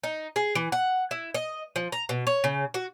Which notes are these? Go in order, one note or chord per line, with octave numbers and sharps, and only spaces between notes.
D#4
G#4
E3
F#5
E4
D#5
F3
A#5
B2
C#5
C#3
F#4